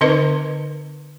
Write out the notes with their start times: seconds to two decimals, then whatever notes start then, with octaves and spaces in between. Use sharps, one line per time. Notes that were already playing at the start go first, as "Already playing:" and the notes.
0.01 D3 C4 D#4 A#4 B4 D#5